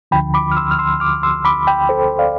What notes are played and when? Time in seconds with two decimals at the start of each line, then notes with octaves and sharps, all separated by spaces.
0.11 D2 D3 F3 G5 B5
0.34 B5 D6
0.51 F6
0.57 C6 E6
0.71 F6
0.79 C6 E6
1.00 D6 F6
1.23 C6 E6
1.45 B5 D6
1.67 G5 B5
1.89 A4 C5
2.19 D5 F5